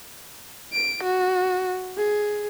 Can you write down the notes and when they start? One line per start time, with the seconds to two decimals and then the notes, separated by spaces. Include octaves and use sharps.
0.73 D7
1.03 F#4
1.97 G#4